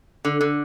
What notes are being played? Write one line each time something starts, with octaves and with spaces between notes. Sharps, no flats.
D3
D3